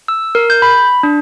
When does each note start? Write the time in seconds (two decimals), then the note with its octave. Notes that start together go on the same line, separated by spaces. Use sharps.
0.08 E6
0.35 A#4
0.50 G6
0.62 B5
1.03 D4